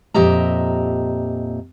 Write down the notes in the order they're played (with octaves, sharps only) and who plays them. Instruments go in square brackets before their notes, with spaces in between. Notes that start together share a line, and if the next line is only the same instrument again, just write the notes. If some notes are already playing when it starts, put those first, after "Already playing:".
[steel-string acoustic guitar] F2 A#2 G4 D#5 E5 A#5